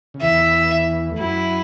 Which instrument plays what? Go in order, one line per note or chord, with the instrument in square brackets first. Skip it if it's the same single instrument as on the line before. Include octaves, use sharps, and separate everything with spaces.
[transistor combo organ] C#3
[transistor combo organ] E2 E3 [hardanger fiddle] E5
[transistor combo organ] A3
[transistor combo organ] F#2 F#3 [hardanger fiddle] E4